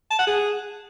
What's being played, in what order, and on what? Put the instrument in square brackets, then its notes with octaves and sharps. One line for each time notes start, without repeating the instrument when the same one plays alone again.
[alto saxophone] A5
F#5
G#4